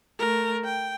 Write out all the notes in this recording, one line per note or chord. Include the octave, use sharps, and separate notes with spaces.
A3 A#4
G5